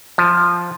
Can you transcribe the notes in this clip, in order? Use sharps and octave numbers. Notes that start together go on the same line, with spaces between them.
F3